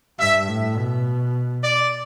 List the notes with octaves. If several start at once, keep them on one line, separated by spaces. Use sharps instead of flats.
G2 E5
A2
B2
D5